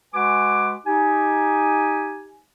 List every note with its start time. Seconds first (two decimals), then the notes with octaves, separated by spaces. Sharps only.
0.14 G#3 F#4 B4 G#5 D6
0.86 D#4 G4 G#5